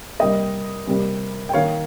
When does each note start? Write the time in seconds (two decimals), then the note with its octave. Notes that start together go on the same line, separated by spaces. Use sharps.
0.19 C3 G3 A#3 D#5 G5
0.87 C3 G3 A#3
1.49 G5
1.53 D#3 A#3 C#5 F5